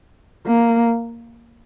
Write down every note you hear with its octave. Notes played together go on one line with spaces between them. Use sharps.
A#3